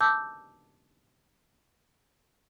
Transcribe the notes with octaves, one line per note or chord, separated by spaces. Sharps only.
A5 D6 E6 G6